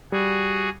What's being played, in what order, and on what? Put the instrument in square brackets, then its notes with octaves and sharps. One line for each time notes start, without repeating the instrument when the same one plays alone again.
[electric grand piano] G3 [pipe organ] F#4 G#4